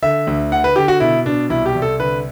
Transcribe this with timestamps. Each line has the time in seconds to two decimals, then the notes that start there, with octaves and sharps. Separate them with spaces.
0.02 D3 E5
0.27 D2
0.52 D3 F#5
0.64 B4
0.76 D3 G4
0.88 F#4
1.00 B2 E4
1.25 B2 D4
1.50 C2 E4
1.66 G4
1.75 C2
1.82 A4
1.99 D3 B4